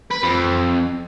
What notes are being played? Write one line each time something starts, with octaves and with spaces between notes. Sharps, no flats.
B4
F2